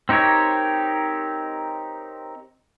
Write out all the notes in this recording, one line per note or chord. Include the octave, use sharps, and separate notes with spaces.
C4 D#4 G4 A#4 C#5